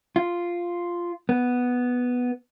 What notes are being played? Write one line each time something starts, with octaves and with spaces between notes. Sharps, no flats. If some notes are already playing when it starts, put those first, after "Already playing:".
F4
B3